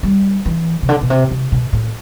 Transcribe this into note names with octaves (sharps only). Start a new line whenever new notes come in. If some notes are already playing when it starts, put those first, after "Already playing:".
G3
E3
C3
D3
B2
C3
C3
B2
A2